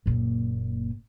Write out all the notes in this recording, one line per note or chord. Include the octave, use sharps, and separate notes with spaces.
F#1 A#2